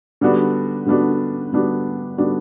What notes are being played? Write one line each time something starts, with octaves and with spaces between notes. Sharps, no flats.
D3 G3 B3 D4 F#4
D3 G3 B3 D4 F#4
D3 G3 B3 D4 F#4
D3 G3 B3 D4 F#4